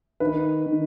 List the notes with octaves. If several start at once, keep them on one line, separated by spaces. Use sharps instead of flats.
D#3 B4
D#3